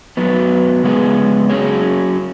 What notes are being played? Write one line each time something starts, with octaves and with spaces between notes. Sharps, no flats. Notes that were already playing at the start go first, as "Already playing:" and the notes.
F#2 F#3 B3
C#3 G#3 B3 G#4
F#3 C#4 G#4 C#5